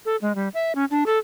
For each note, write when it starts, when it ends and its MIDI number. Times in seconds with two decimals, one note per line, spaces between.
0.06 0.16 69
0.21 0.35 56
0.35 0.48 55
0.54 0.73 76
0.75 0.85 61
0.91 1.04 62
1.06 1.19 69